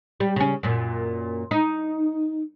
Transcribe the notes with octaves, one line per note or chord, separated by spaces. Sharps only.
G3
C#3 C#4
F#2 A#2
D#4